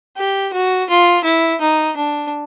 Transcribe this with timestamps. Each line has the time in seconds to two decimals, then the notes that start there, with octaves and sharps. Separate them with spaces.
0.17 G4
0.54 F#4
0.90 F4
1.24 E4
1.61 D#4
1.97 D4